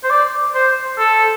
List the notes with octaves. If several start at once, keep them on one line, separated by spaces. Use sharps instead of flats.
C5
D5
C5
A4